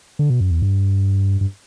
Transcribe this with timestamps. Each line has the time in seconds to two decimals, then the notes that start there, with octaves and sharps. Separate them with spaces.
0.19 D3
0.30 B2
0.40 F#2
0.51 E2
0.62 G2
1.41 G2